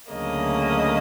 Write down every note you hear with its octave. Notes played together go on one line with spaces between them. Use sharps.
D2 C#3 F#3 A#3 D#5